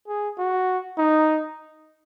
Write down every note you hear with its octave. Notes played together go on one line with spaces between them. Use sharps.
G#4
F#4
D#4